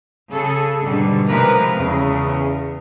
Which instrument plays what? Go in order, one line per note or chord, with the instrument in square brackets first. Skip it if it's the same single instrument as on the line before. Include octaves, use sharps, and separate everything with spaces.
[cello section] C#3 G#4 A4
G#2 B2 D3 G3
C3 F3 G#3 A#4 B4
E2 C#3